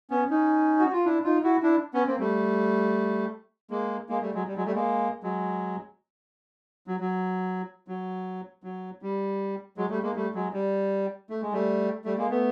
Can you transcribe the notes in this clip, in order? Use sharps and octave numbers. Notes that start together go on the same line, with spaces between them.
B3 C#4
C#4 D#4
F#4
F4
D4 E4
D#4 F4
E4 F#4
D4 E4
B3 C#4
A#3 C4
G3 A3
G#3 A#3
G#3 A#3
G3 A3
F#3 G#3
G3
F#3 G#3
G3 A3
G#3 A#3
F#3 G#3
F#3
F#3
F#3
F#3
G3
F#3 G#3
G3 A3
G#3 A#3
G3 A3
F#3 G#3
G3
A3
G#3
G3 A3
G3 A3
G#3 A#3
A3 B3